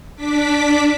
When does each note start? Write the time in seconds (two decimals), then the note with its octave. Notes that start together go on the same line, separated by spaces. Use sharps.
0.16 D4 D6 B6